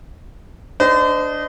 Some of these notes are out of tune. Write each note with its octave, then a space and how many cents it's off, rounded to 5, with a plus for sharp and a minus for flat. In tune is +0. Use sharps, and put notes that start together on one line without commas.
D4 +0 C5 -40 D#5 +0